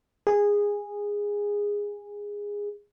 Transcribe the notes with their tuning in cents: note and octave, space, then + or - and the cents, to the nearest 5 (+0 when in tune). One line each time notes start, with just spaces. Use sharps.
G#4 -15